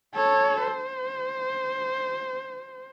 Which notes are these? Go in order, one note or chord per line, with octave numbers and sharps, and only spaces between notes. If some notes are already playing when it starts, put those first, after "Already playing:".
A4 C#5
C5